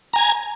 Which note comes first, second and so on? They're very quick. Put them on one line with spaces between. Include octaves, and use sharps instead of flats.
A#5 G#5 G#6